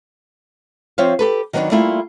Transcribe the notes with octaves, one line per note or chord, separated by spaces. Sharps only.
F3 C4 C#5 E5 F5
G4 A4 B4
D#3 F#3 B3 C4 D4 D#4
G3 A3 A#3 E4 F4